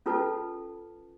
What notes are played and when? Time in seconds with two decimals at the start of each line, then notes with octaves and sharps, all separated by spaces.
0.06 C#4 F4 A4 B4 A5